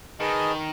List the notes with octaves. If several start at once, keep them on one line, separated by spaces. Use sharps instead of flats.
D#3 G#4 B4 D#5 A5